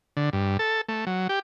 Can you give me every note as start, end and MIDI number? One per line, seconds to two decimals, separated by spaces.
0.17 0.30 50
0.33 0.57 43
0.59 0.81 69
0.89 1.05 57
1.07 1.28 54
1.29 1.39 67